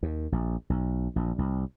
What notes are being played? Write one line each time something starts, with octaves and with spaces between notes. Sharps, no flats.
D#2
A#1
B1
A#1
C2